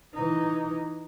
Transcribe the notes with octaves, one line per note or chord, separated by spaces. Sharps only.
E3 D#4